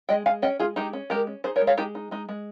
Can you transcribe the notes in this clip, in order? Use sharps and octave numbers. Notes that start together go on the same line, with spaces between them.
G#3 D#5 G5
G#3 F5 G#5
C#4 D#5 G5
G#3 F4 G#4
G#3 D#4 G4
C#4
G#3 G4 A#4
C#4
D#4 G#4 C5
A#4 C#5
G#3
C#5 F5
G#3 D#4 G4
D#4
G#3 D#4
G#3